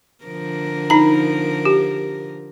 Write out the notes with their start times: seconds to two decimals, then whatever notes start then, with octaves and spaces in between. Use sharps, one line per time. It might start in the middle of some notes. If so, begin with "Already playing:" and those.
0.25 D3 F3 A#4
0.90 D#4 A#5
1.65 G4